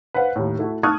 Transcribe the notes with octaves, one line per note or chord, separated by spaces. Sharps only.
B4 C5 F5 F#5
D#2 A2
A3 E4 F#4
A5 C#6 D#6 F6 F#6 G#6